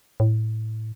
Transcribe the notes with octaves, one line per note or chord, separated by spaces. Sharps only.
A2